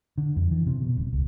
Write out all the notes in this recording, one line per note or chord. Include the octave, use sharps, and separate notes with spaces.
D3
F2
E3
C3
B2
D#1
C#2